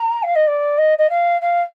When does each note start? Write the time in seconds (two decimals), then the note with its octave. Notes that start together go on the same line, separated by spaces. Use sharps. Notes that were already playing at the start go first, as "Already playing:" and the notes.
Already playing: A#5
0.23 F5
0.35 D#5
0.47 D5
0.78 D#5
0.98 D#5
1.09 F5
1.41 F5